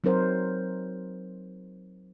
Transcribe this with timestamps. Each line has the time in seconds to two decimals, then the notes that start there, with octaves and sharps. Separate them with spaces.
0.04 F#3 C4 D#4 A#4 C5